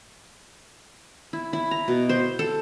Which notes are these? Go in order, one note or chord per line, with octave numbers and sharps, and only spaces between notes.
E4
E4
A#5
B2
C5
A4